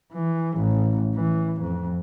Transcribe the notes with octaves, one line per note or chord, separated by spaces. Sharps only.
E3
A1
E3
F2